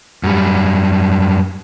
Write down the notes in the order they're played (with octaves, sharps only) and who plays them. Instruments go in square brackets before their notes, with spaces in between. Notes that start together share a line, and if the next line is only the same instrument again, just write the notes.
[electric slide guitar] F#2 G3